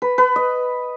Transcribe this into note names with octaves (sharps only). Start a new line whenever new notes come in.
B4
B4
D#5